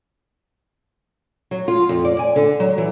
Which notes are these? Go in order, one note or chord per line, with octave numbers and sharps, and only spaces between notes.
F#3
F4
F2
D5
G#5
D3
F#3
E3